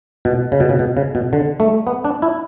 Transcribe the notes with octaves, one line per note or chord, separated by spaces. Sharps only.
B2
C#3
B2
C#3
B2
C#3
B2
D3
A3
B3
D4
E4